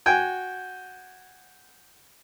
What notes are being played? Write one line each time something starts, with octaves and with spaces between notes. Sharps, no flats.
F#4 G5 G#5